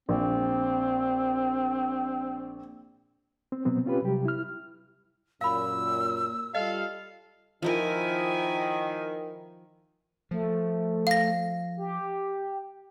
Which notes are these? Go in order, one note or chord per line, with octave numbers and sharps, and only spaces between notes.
A#1 C4
C4
B2 F#3 B3 C4
C4 C#4 F4 G4 B4
C3 F#3 G3 G4
E4 F6
F#2 A#2 F5 B5 E6
G3 F4 A4 D#5 F5
D#3 F3 D#4 E4 A#4 G#5
F3 A3
F5 A#6
G4